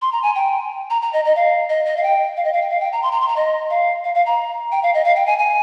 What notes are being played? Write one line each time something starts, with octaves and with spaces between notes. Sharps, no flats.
C6
A#5
G#5
G5
A#5
A#5
D#5
D#5
F5
D#5
D#5
F5
G5
F5
D#5
F5
G5
F5
G5
A#5
C6
A#5
C6
A#5
D#5
F5
F5
F5
A#5
G5
F5
D#5
F5
G5
G#5
G#5